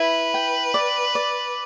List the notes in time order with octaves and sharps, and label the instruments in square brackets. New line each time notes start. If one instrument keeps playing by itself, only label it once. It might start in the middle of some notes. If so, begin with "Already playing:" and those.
Already playing: [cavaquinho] E4 [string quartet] B4
[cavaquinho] G5
D5
D5